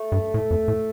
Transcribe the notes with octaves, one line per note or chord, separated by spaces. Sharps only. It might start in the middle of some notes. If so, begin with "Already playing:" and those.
Already playing: A3
G2
A2
F2
A2